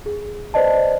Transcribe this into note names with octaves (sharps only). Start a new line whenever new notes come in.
G#4
B4 C5 D5 D#5 A5